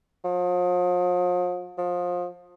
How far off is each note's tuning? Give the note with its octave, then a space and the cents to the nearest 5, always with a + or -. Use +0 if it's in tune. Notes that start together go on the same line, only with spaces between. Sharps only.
F3 +40
F3 +25